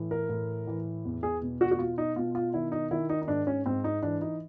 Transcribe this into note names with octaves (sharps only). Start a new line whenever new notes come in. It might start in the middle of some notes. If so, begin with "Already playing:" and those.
Already playing: A2 E3
A#4
A2
E3
E2
G#4
B2
F#4
F#4
B2 F4
D#4
B2 F4
F4
D#3 E4
D#4
D#3 E4
D#4
D#4
G#2 D4
C#4
G#2 C4
D#4
E3 D4
D#4